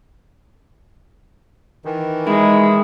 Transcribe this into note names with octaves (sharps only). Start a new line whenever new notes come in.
D#3 E3
G#3 D#4 E4